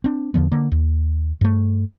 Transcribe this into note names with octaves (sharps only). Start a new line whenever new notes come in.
C4 D4
E2 D3 F3 B3
D3 A#3
D#2
G2 A3